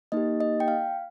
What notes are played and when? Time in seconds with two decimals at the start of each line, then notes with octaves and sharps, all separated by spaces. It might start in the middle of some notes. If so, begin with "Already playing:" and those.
0.12 A#3 D#4 G4 D#5
0.40 D#5
0.60 G5
0.68 F5